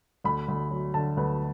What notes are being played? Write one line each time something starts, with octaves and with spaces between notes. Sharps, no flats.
D2 B5
D2
F#3
D3 A5
D2 B4